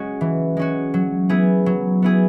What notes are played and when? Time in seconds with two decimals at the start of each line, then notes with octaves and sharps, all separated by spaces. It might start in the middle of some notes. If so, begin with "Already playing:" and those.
Already playing: G#3 C#4 F#4
0.21 E3
0.57 G#3 C#4 F#4
0.94 F#3
1.29 B3 E4 G#4
1.66 F#3
2.02 B3 E4 G#4